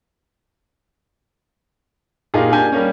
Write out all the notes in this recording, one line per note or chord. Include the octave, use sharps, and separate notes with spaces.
A#2 D#4 F4 G4 G#4
A#3 D4 G4 G#5 G6
G3 A#3 C#4